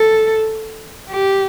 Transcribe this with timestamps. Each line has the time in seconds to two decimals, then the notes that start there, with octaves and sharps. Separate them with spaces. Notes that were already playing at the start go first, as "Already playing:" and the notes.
Already playing: A4
1.10 G4